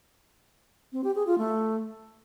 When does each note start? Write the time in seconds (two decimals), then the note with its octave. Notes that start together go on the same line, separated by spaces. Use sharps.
0.93 C4
1.04 G4
1.15 G#4
1.27 F4
1.38 A3